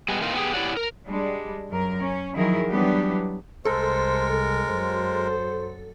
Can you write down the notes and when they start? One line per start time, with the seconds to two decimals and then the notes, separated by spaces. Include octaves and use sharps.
0.09 G3 G#3 B3
0.21 E3 A#3 C4 D#4 F4
0.34 B3 G4 G#4
0.54 E4 G4 C#5 D5 F#5
0.77 A#4
1.07 G3 G#3 D4
1.70 F#2 A#4
1.99 C#4
2.36 D#3 F3 F#3 E4 G#4 A#4
2.69 E3 F#3 G3 B3 D4 G4
3.65 C2 C3 G#3 A4 A#4 C5
4.70 F#2 F#3 C5